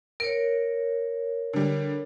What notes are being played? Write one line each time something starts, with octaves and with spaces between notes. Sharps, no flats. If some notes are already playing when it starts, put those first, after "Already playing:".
A#4 C#5 D7
D3 G3